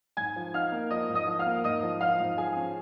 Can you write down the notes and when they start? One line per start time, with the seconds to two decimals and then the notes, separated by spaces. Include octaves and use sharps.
0.17 G#2 G#5 G#6
0.36 F3
0.54 D#4 F5 F6
0.72 A#3
0.91 F3 D#5 D#6
1.09 G#2
1.15 D#5 D#6
1.27 F3
1.39 F5 F6
1.46 A#3
1.64 G#2 D#5 D#6
1.83 F3
2.01 F3 F5 F6
2.20 G#2
2.37 F3 G#4 G#5
2.56 C#4